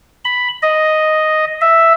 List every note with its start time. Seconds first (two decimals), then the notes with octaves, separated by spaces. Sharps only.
0.25 B5
0.62 D#5
1.61 E5